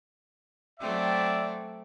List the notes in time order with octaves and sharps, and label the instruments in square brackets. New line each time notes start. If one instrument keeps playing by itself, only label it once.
[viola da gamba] F#3 A3 C4 [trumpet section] D5 E5